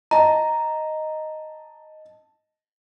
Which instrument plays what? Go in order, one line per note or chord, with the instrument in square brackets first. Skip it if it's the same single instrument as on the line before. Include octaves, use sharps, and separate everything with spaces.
[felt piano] D#5 A5 [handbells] A#5